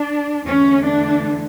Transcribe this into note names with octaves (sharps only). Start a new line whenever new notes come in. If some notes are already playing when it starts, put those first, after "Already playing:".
Already playing: D4
E2 D3 A3 C#4
D4